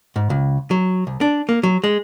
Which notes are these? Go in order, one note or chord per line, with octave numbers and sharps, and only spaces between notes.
G#2
C#2
F#3
C2
D4
A#3
F#3
G#3